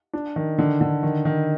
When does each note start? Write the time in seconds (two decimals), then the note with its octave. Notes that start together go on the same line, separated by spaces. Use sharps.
0.13 D4
0.36 D#3
0.58 D3
0.81 D3
1.03 D#3
1.25 D#3